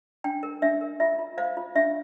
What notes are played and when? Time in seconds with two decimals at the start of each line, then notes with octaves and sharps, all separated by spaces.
0.24 D4 G5
0.43 A#4
0.62 D4 E5
0.81 A#4
1.00 F4 E5
1.19 F4
1.38 C5 F5
1.57 F4
1.75 D4 E5